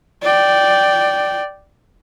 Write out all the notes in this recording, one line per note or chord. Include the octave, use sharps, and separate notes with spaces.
D5 G5